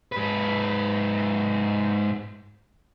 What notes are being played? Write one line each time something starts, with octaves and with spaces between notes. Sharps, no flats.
G#2 B4